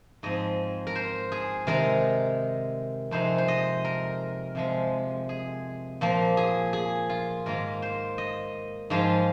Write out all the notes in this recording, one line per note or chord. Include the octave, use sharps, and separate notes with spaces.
G#2 F3 C4 D#5
A#4
C5
G#4
C3 D#3 G#3 D#4 A#4
F2 C3 G#3 D#4 C5
C5
D#5
A#4
C3 F3 G#3
G#4
A#2 F3 A#3
G#4
G#4
F4
G#2 D#3 A#3 F4 A#4
C5
D#5
G#2 F3 G#3 F4